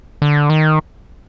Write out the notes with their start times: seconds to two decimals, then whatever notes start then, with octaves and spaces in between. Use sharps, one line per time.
0.22 D3
0.50 D#3